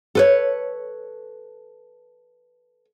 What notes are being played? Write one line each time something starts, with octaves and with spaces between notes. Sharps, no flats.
A4 B4 C#5